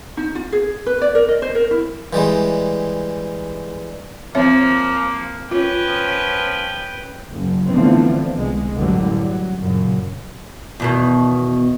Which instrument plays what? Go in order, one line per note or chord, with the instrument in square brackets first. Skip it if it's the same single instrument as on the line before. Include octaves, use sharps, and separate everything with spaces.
[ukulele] D#4
F4
G#4
B4
D5
A#4
D#5
C5
A#4
E4
[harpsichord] E3 G3 G#3
[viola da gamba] F3 [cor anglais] A#3 [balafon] C4 C#5 E5
[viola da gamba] C#4 [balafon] F4 [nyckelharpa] B4 G5
[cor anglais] F3
[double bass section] F#1 F#2
D3 E3 F3 A3 B3 C4
C2 G#3
A1 F#2 D3 F#3 G3
F#3
F#2 A#2 C#3
[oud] E2 B2 D#3